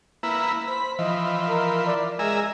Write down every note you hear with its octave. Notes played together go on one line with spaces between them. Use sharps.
A#3 E4 B4
C5 B5
E3 F3 D#5
A#4
D5
G#3 G#4 A#4 E5